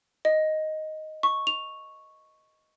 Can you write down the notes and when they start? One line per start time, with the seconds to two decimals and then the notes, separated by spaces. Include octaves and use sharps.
0.25 D#5
1.23 C#6
1.47 F7